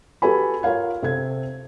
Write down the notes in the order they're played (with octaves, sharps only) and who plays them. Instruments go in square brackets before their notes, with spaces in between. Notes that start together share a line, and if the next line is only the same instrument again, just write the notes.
[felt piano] F#4 G4 A4 B4 G#5 B5
F4 A#4 C#5 F5 G#6
C3 C4 A4 G#6